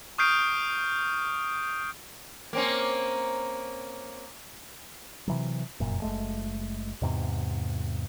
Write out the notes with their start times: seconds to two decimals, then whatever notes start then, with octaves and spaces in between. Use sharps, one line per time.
0.18 C#6 D#6 F6 G6 C7 D7
2.53 A#3 C4 C#4
5.28 C3 E3 F#3
5.80 F1 F#2 A#2
6.02 F#1 E2 G#3 A3
7.02 E2 G#2 C3